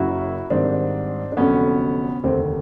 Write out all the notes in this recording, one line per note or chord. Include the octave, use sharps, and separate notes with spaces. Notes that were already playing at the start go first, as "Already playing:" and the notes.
Already playing: F#1 F#2 C#3 F#3 E4 F#4
G#1 G#2 D#3 G3 C4 D4
D4
F1 F2 D3 F#3 B3 C#4
F1 D#2 D3 C4